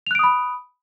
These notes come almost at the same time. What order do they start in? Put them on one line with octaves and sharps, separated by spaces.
F7 F#6 D7 D#6 B5